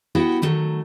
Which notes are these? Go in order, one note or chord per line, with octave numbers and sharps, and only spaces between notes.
B3 E4 F#4 G4 F#5 G5
D#3 F#3 A3